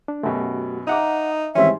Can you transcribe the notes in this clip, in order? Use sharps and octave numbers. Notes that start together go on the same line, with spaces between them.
D4
F#2 B2 A3 F#4 G4
D#4 E5 F#5 A#5 D6 D#6
G#2 D#3 E3 G3 C4 C#4 E5 C6